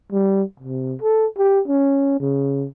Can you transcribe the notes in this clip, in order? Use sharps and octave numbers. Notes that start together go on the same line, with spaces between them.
G3
C3
A4
G4
C#4
C#3